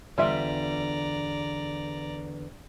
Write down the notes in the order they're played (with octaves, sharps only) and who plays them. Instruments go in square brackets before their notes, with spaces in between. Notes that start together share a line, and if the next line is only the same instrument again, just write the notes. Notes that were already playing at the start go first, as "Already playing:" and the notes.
[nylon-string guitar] E2 D3 [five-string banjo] G3 F4 E5 [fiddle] D5 A#5